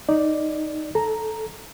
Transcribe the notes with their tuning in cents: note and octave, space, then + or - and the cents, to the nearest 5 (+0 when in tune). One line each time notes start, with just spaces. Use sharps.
D#4 -5 D5 +0
A4 -10 A#5 +0